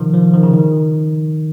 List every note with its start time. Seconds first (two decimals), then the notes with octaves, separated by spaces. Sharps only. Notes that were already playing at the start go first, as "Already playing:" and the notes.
Already playing: C3 D#3 F3
0.14 F3
0.34 D#3
0.43 C#3
0.53 D#3